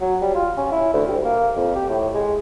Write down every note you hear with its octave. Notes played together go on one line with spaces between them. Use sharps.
F#3
G3
F4
C#4
E4
D2
G3
A#3
F2
G4
A2
G#3